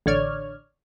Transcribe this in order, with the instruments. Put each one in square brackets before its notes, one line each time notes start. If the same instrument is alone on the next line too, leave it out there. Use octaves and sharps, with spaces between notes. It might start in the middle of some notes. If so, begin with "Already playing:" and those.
[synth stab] A1 D3 C#5 D5 F6 G#6